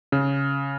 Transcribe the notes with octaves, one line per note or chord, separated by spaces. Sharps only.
C#3